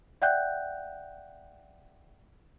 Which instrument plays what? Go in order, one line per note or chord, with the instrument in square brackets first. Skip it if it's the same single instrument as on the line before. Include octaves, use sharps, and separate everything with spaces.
[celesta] D5 E5 F#5 G5 F#6 G6